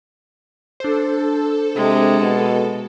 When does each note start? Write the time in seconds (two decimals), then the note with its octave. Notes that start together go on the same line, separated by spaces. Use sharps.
0.80 D4 A4 C5
1.76 C3 G#3
2.21 B2